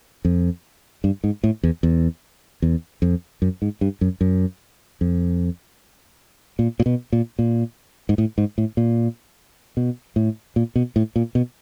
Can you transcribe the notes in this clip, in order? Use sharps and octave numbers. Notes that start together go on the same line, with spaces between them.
F2
G2
G#2
A2
E2
E2
E2
F2
F#2
G#2
G2
F#2
F#2
F2
A#2
A#2
B2
A#2
A#2
G#2
A2
G#2
A2
A#2
B2
A2
A#2
B2
A2
A#2
B2